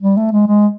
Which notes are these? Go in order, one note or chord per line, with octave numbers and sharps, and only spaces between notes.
G3
A3
G#3
G#3